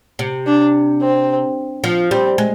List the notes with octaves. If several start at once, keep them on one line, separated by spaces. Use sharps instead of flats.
C3
D4
C4
F3
G3 C4
G#3